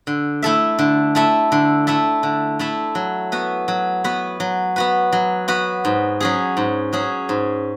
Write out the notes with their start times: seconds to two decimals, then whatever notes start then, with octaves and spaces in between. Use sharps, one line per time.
0.07 D3
0.42 A3 E4 A4 E5
0.79 D3
1.15 A3 E4 A4 E5
1.52 D3
1.87 A3 E4 A4 E5
2.23 D3
2.59 A3 E4 A4 E5
2.95 F#3
3.32 B3 F#4 B4
3.68 F#3
4.04 B3 F#4 B4
4.40 F#3
4.76 B3 F#4 B4
5.12 F#3
5.48 B3 F#4 B4
5.85 G#2
6.20 F#3 C#4 G#4
6.57 G#2
6.93 F#3 C#4 G#4
7.29 G#2